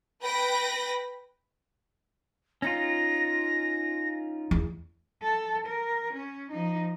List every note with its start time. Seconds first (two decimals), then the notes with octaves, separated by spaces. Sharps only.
0.22 B4 G5 B5 A#6
2.62 C#4 D#4 F4 A#6
4.51 E2
5.22 A4
5.67 A#4
6.13 C#4
6.51 F3 D#4